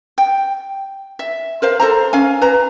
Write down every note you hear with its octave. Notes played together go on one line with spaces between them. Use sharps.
G5
E5
A#4 C5 F5
A4 C5 A#5
C#4 F5 G#5
B4 A#5